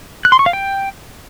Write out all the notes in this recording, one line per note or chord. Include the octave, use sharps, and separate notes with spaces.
F#6
C6
C#6
F5
G5